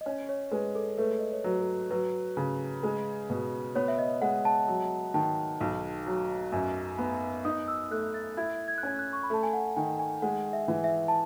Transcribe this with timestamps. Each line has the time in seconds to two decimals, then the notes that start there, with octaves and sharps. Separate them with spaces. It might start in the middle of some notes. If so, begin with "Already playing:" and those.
0.01 D#5
0.06 C#4 C#5
0.29 C#5
0.51 G#3 B4
0.75 A4
0.98 A3 B4
1.19 D#5
1.33 C#5
1.44 F#3 B4
1.60 A4
1.91 F#3 B4
2.37 C#3
2.83 G#3
3.30 B2
3.75 B3 C#5
3.88 E5
3.99 D#5
4.21 G#3 F#5
4.45 A5
4.68 F#3
5.14 D#3 A5
5.61 B1
6.07 F#3
6.52 F#2
6.99 B3
7.45 D#4 D#6
7.68 E6
7.91 A3 F#6
8.14 A6
8.37 E4 G#6
8.68 G#6
8.78 F#6
8.83 C#4 G#6
8.99 F#6
9.13 C#6
9.23 B5
9.30 A3 A5
9.43 G#5
9.53 F#5
9.76 D#3 G#5
9.99 G#5
10.22 G#3 F#5
10.53 E5
10.68 E3
10.84 E5
11.08 A5